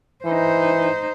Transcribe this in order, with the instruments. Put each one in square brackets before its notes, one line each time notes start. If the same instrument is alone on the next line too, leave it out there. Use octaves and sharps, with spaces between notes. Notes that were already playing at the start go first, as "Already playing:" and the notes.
[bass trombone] E3 [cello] D#4 C5